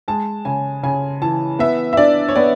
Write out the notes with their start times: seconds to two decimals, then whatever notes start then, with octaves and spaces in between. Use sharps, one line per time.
0.08 G#3 A5
0.45 C#3 G#5
0.83 C#3 G#5
1.22 E3 A5
1.59 B3 E5
1.93 E5
1.97 D4 D5
2.29 C#5
2.35 B3 D5